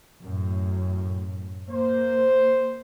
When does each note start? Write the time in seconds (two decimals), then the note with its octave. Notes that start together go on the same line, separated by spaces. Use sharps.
0.21 F#2 A2
1.69 A#3 C5